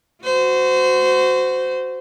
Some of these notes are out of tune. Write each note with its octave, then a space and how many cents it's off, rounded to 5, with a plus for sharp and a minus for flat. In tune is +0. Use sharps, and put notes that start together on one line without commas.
F#4 +0 C5 -25